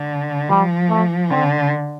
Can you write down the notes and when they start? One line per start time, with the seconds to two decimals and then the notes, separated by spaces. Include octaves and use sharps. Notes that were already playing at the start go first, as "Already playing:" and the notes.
Already playing: D3
0.50 F3 G3
0.90 A3
1.31 D3 C4